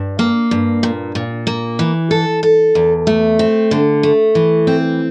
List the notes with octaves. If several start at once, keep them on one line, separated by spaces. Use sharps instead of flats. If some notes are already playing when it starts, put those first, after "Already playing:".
Already playing: G2
A#3
G2
A#2
A#2
A#3
E3
A4
A4
E2
A3
C4
D3
A3
E3
C4